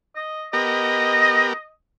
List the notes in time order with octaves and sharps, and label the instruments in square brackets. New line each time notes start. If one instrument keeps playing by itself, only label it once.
[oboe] D#5
[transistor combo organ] B3 G4 A#4 [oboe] D#5